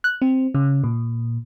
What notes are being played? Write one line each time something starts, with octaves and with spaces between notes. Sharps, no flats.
F#6
C4
C#3
A#2